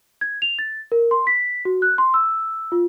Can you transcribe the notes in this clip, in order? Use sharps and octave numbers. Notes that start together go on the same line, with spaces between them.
G#6
F7
A6
A#4
C6
B6
F#4
F#6
C6
E6
F4